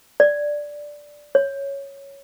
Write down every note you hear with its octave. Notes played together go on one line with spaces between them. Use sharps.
D5
C#5